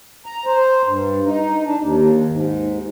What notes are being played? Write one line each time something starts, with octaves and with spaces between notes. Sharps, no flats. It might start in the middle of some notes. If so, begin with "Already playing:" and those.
A#5
C5
G2
D#4
D4
D#2
G#2